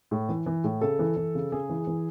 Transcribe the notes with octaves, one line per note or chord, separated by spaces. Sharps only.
A2
E3
E3
A2
C#3 A4
E3
E3
C#3
C#3 G#4
E3
E3